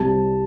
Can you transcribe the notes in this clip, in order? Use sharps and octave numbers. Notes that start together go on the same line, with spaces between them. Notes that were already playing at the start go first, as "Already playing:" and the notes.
Already playing: C2 C3 G3 A5